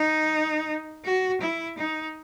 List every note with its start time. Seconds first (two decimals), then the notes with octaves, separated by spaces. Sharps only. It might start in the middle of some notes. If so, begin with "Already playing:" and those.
Already playing: D#4
1.04 F#4
1.41 E4
1.78 D#4